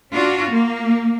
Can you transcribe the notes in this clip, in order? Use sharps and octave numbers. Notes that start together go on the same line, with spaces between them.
D4 F4 F#4
A#3